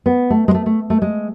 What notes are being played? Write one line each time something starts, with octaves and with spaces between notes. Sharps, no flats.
B3
A3
G#3
A3
A3
A3
G#3